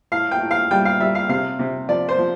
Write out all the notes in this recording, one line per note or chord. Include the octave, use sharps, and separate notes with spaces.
A2 F5
G5
A2
F5
G3 G5
F5
G3 E5
F5
C3 F5
C3
F3 D5
C5
F3